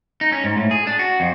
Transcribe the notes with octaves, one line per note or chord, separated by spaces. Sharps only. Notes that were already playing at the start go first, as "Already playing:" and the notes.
D#4
C#4
G#2
A2
G#4
D4
F#4
F2